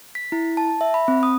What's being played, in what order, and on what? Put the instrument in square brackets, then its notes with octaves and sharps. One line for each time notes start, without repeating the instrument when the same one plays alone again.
[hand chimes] B6
E4
A5
E5
B5
C4
D#6